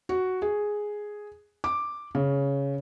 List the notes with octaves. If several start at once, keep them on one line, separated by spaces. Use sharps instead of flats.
F#4
G#4
D6
C#3